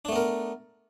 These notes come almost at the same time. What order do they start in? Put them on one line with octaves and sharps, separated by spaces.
D4 A3 B3 A#4